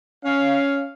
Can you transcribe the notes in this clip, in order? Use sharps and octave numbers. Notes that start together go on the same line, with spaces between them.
C#4 F5